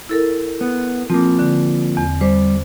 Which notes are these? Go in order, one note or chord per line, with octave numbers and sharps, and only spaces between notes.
E4 A4 A#4
B3
F3 A#3 C4
D3
E2
G3 C5